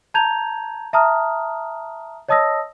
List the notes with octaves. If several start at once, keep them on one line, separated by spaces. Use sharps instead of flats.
A5 A#5 G6 G#6 F7
E5 A5 A#5 D#6 F6
C#5 D#5 A5 D#6 E6 A#6